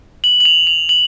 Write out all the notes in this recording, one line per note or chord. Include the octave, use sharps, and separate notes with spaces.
F#7
F#7
F7
F7
F#7